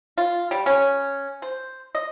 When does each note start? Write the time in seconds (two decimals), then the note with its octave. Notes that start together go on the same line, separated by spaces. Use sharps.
0.18 F4
0.51 G3
0.66 C#4
1.42 C5
1.95 D#5